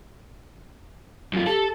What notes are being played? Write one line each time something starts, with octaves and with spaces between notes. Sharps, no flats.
F#2 F4
G4 A4